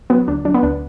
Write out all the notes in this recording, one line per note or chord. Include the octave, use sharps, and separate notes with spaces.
F#3 B3
D2 D4
F#3 D4
B3
D2 D4